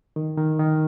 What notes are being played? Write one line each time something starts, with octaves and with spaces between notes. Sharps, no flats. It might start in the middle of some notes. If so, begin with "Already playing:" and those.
D#3
D#3
D#3